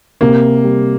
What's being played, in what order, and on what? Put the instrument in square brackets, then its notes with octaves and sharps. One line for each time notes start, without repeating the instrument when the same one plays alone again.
[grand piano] C3 [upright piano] A#3
[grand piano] G3